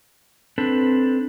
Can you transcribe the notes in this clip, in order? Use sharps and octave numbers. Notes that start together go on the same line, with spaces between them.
C4 D4 A4 B4